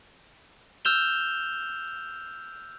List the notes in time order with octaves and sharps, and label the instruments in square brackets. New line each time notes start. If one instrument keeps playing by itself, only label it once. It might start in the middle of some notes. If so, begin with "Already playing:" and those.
[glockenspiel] E6 F6 G6 E7 F7 G7